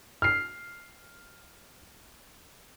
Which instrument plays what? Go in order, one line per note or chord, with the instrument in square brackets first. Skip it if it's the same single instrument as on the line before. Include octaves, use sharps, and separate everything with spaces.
[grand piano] F6 C7